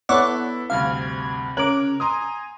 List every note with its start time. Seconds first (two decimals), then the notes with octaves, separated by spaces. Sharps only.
0.09 B3 E4 A4 C#5 D5 F#5
0.70 D2 G2 C3 F5 G#6
1.57 C#3 A#4 C#5 D6 F#6
2.00 G#5 A#5 C6 D#6